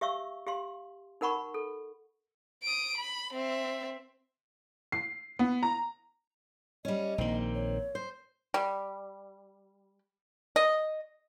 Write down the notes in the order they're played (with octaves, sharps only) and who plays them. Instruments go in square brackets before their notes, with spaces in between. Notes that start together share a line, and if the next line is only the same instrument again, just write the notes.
[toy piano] G4 E5 F5 C#6 E6
G4 F5 C6
D#4 A#4 F#5 B5 C#6
A4
[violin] D#6 D7
B5
C4 E5
[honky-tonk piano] C7
B3
A#5
[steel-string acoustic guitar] G3 C#4 [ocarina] D#5
[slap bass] A#1 D#3 [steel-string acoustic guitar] A#3 C4
[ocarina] C#5
[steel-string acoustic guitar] C5
[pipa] G3
D#5